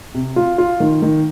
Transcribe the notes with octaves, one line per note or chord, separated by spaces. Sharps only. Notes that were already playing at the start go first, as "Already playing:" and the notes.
C3
F4
F4
D#3
D#3